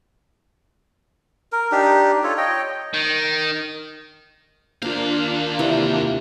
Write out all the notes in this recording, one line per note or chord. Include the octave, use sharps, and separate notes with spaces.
A#4
D4 D#4 G4
F4 A4 C#5
C#5 D#5 G5
D#3
D#2 A#3 D4 F4 C5 F5
C3 E3 C#6